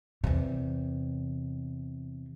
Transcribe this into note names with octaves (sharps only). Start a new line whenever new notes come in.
E2 C3